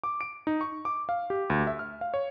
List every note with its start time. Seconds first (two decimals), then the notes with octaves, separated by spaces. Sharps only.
0.04 D6
0.21 D7
0.47 D#4
0.61 C#6
0.85 D6
1.09 F5
1.30 G4
1.50 D2
1.67 E5
1.79 F6
2.01 F5
2.14 C#5